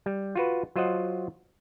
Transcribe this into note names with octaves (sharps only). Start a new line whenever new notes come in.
G3
F4 F#4 B4
F#3 F4 C5 D#5 F#5